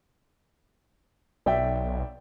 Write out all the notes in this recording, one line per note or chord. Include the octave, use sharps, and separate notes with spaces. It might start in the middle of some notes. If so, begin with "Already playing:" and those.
B1 D5 E5 G5